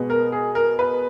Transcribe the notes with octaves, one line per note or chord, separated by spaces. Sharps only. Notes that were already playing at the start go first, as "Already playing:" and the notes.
Already playing: B2 G#3 B3
A#4
G#4
A#4
B4